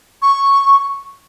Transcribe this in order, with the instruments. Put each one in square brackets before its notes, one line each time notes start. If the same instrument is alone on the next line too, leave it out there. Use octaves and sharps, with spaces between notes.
[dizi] C#6